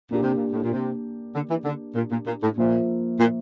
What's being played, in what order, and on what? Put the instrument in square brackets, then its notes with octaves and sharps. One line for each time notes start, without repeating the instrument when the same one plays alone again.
[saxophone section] A#2 [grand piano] A#3 D4 G4
[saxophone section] C3
A#2
A2
A#2
C3
D3
E3
D3
A#2
A#2
A#2
A2
[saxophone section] A#2 [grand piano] F3 A#3 F4 C5 E5
[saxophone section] A#2